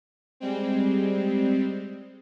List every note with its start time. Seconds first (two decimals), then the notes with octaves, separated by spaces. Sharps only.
0.40 G3 G#3 C4